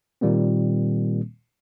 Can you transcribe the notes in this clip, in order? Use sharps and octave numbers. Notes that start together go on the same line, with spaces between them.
A#2 D#3 G3 A#3 C4